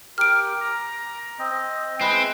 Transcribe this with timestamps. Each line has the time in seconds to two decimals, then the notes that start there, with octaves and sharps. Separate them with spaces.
0.18 G4 A#4 F6 D7
0.61 A#5
1.39 C4 D#5
2.01 G#3 C4 E4 B4